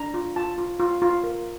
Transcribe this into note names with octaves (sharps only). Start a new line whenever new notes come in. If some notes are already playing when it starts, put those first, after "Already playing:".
Already playing: D4 A#5
F4
F4 A5
F4
F4
F4
A#4